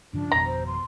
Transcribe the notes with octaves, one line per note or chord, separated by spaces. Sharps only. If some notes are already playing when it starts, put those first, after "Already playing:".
G2 C#3 F3 D4
G#1 F2 B2 A#5
C5
C6